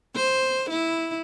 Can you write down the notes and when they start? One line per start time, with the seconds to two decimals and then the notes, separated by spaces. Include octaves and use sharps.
0.16 C5
0.70 E4